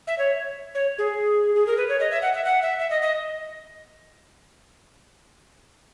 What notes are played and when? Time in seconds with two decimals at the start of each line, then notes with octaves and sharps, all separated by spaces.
0.07 E5
0.19 C#5
0.75 C#5
0.98 G#4
1.55 G#4
1.67 A#4
1.77 B4
1.89 C#5
2.00 D#5
2.11 E5
2.22 F#5
2.34 E5
2.45 F#5
2.62 E5
2.79 E5
2.90 D#5
3.02 D#5